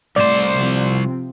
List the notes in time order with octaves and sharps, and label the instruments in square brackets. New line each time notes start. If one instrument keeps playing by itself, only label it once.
[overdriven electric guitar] C2 C5 [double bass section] A2 [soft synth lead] D5
[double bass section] C3 F3 C4